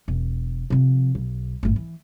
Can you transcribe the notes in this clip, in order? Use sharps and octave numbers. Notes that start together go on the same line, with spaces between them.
E1
C3 F3
B1
G1 A2
E3